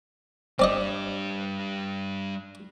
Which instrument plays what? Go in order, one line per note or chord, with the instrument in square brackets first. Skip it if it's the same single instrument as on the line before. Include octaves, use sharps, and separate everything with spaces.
[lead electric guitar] G3 D4 [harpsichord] C4 D5 D#5